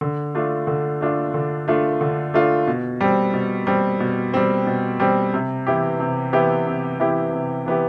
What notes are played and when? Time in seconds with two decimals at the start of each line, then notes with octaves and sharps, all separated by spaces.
0.01 D3
0.35 A3 D4 F4
0.67 D3
1.01 A3 D4 F4
1.34 D3
1.68 A3 D4 F4
2.01 D3
2.34 A3 D4 F4
2.68 B2
3.01 G3 C4
3.34 B2
3.67 G3 C4
4.00 B2
4.34 G3 C4
4.67 B2
5.00 G3 C4
5.34 C3
5.67 E3 B3 E4 G4
6.00 C3
6.33 E3 B3 E4 G4
6.67 C3
7.00 E3 B3 E4 G4
7.33 C3
7.66 E3 B3 E4 G4